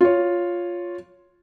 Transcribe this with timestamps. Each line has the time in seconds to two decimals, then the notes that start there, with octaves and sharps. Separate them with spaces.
0.01 F4 C#5